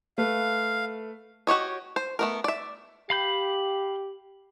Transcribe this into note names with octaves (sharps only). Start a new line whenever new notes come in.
A3 B4 F5
F#4 G4 C#5 D#5
C5
A3 B3 A#4
D5 E5
G4 F5 B5 G6